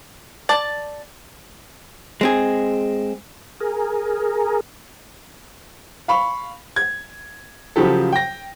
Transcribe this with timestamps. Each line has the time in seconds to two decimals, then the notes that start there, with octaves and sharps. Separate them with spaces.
0.49 D5 A5
2.21 G#3 C4 G#4
3.60 G#4 A#4
6.08 F5 B5 C#6
6.76 G#6
7.76 C#3 F3 F#3 G4 A4
8.13 G5 A#6